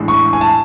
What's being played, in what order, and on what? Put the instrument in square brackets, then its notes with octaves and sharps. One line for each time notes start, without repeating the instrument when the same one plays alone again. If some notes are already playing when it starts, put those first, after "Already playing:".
Already playing: [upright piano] A1 A2 G#3 D4
C#6
G#5
A5